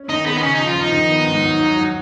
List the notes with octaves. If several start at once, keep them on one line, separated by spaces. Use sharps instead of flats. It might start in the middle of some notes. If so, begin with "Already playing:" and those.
Already playing: C#4
D#3 D#4
B3 G#4
D#4
C#3 C#4
F3 D#4
F4
F3 D#4
D#3
B3
G#2
F#3
F#3
F#3